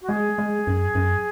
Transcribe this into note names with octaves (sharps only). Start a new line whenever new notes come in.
F#4
G#3 G#4
G#3
F#2
F#2